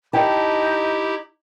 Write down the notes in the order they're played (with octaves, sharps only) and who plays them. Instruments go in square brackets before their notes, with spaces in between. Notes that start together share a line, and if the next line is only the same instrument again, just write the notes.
[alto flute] D#4 [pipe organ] E4 G4 [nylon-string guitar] G5 A5